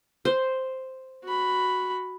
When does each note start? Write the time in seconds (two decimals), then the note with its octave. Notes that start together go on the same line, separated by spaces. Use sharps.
0.25 C5
1.24 F#4 B5